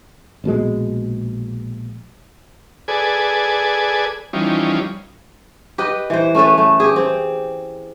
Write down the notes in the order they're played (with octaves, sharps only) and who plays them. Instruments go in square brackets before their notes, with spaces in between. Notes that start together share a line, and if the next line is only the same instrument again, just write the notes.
[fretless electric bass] A#1 B2 D#3 G#3
[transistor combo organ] G#4 A4 B4 D5 G#5
E3 F3 G3 C#4 D#4
[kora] G4 B4 D#5
E3 C5
A3 C#4 A4 B4
A3
G4 G#4
C4